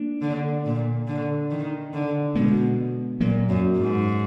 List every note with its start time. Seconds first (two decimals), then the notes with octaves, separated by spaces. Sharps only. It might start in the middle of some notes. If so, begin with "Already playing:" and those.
Already playing: A#3 D4
0.22 D3
0.65 A#2
1.08 D3
1.51 D#3
1.94 D3
2.35 B2 G#3 B3
3.20 A#2 F#3 A#3
3.50 F#2
3.77 G#2